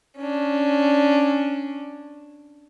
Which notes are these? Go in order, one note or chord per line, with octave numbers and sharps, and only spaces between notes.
C#4 D4